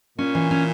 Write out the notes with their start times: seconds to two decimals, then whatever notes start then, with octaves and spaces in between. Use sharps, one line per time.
0.18 A#2 C#4
0.35 E3
0.51 C#4